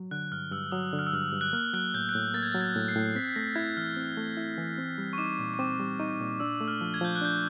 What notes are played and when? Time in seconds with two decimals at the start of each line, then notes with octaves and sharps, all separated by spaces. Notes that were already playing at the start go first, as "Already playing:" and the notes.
Already playing: F#3
0.11 D3 F#6
0.32 G2 F6
0.51 G2 E6
0.72 F#3 D#6
0.93 D3
0.99 F6
1.07 E6
1.13 G2 F6
1.32 G2
1.41 F#6
1.53 A#3 F6
1.73 F#3 F#6
1.94 A2 G6
2.09 F#6
2.14 A2 G6
2.34 A#3 A6
2.43 G#6
2.52 F#3 A6
2.61 G#6
2.75 A2
2.88 C7
2.96 A2
3.15 C4 B6
3.29 B6
3.36 A3 A#6
3.56 E4 G#6
3.77 E3 F6
3.97 C4
4.17 A3
4.37 E4
4.58 E3
4.78 C4
4.98 G3
5.13 C#6
5.18 D#4 D6
5.39 A#2
5.54 C#6
5.59 C4 D6
5.79 G3
5.99 D#4 C#6
6.20 A#2
6.40 D4 E6
6.60 A3
6.68 F6
6.81 F3
6.94 G#6
7.01 F3 G6
7.16 F#6
7.21 D4 G6